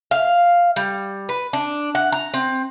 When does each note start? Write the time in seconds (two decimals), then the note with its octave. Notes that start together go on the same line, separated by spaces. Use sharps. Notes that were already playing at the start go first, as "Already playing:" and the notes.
0.11 F5
0.76 G3
1.29 B4
1.53 D4
1.95 F#5
2.12 A#5
2.34 C4